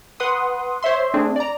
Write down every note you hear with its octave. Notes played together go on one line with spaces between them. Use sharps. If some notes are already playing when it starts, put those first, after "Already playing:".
B4 F#5 C6 D#6
C5 C#5 E5 C6
A3 C4 D4 G#4
D5 A#5